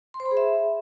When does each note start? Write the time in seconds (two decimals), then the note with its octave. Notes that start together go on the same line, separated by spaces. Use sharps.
0.14 C6
0.20 C5
0.26 B5
0.31 G#4
0.37 E5